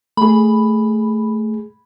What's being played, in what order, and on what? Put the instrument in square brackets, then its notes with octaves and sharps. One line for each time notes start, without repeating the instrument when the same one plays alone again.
[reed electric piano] A3 G#4 [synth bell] B5